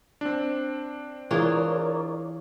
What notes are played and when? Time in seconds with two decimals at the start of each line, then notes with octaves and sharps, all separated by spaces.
0.21 C4 D4
1.31 E3 F4 G#4 A#4 C#5 D5